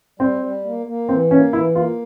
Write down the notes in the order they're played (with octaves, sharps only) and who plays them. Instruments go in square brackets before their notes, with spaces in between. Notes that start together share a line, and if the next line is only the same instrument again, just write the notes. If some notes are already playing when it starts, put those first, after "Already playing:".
[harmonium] G3 [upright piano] C4
[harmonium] G3
A#3
A#3
[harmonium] E3 [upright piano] C4
[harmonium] A#3 [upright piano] C#4
[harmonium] E3 [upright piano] E4
[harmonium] A#3 [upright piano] F4